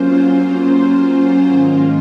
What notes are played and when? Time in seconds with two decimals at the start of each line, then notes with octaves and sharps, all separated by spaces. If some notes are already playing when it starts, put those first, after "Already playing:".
Already playing: F#3 A#3 C#4 F4 C5
0.57 C#4
1.47 G#2 D#3 A#3 F4